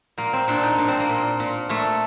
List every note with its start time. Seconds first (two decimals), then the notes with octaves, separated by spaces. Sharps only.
0.18 A#2 A#3
0.33 C4
0.48 A#2 D4
0.63 D#4
0.78 A#2 D4
0.88 C4
0.99 A#3
1.09 A#2
1.40 A#2
1.69 A#2 A3